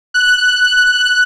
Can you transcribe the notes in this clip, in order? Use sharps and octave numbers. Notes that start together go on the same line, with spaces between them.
F#6